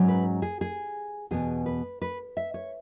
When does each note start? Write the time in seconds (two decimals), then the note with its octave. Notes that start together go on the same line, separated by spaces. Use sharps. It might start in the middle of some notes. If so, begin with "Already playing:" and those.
Already playing: G#2 F#3 C#4
0.08 B4
0.42 G#4
0.61 G#4
1.31 E2 B2 B3 G#4
1.66 B4
2.02 B4
2.37 E5
2.54 C#5